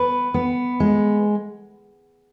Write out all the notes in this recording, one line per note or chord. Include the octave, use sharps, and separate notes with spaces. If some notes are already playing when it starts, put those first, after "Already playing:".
Already playing: B3 B4
B3
G#3